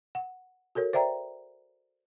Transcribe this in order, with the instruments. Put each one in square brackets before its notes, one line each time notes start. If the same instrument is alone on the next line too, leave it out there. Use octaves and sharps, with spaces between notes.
[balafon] F#5
F#4 A4 A#4 C#5
C5 D5 E5 G5 A#5